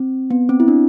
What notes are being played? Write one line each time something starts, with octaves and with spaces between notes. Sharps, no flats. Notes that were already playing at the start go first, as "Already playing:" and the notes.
Already playing: C4
B3
C4
E4
D4